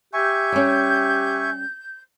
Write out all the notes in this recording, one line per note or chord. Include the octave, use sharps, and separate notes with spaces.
G4 E5 G#5 C#6 G6
G3 C#4